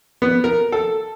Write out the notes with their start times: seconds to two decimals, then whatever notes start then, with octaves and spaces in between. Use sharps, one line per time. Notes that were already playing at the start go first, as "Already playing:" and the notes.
0.22 B3
0.44 A#4
0.72 A4